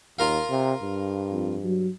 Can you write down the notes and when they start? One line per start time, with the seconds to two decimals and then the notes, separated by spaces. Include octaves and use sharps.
0.19 D#2 F4 A#4 F5
0.50 C3
0.82 G2
1.31 F2
1.64 F#3